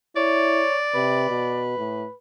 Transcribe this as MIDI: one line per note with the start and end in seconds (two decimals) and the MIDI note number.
0.16 0.65 64
0.16 0.77 73
0.16 1.65 74
0.95 1.27 48
0.95 2.14 71
1.30 1.76 47
1.78 2.06 45